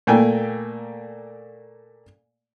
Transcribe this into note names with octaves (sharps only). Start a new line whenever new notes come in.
A#2 A3 A#3 G5 G#5